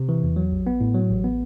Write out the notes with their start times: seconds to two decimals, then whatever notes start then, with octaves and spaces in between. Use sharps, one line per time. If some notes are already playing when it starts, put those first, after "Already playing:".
Already playing: C3
0.09 E3
0.23 E2
0.36 F#3
0.52 A1
0.67 B3
0.81 A2
0.94 F#3
1.10 A1
1.24 B3